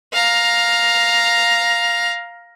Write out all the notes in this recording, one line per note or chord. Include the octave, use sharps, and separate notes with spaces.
F5 A#5